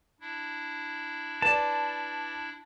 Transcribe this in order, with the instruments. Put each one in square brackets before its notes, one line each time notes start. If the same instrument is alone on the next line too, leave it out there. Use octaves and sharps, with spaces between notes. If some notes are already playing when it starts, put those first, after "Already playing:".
[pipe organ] D4 E4
[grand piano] B4 D5 [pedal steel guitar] A5